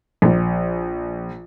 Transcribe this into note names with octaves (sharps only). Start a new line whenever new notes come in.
A#1